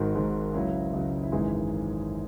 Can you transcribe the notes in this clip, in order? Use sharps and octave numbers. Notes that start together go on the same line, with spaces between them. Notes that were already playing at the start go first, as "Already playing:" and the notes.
Already playing: G#1 G#2 D#3 G#3 F#4
G#1 G#2 D#3 G#3
C#2 C#3 F#3 E4
C#2 C#3 F#3
E4
G#1 F#2 E3 G#3 D#4